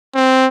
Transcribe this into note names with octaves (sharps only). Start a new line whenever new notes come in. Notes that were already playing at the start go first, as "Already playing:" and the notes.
C4